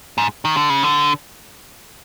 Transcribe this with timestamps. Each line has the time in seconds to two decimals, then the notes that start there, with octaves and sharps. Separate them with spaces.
0.18 G#2
0.45 D#3
0.57 D3
0.70 C#3
0.83 D3